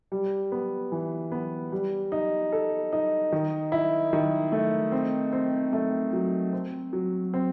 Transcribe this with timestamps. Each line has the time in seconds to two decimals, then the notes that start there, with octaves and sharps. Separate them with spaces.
0.12 G3
0.52 B3
0.92 E3
1.32 B3
1.72 G3
2.12 D#4
2.52 A4
2.93 D#4
3.32 D#3
3.72 E4
4.13 D#3
4.52 A3
4.92 C4
5.33 C4
5.73 A3
6.13 F#3
6.53 C4
6.93 F#3
7.34 C4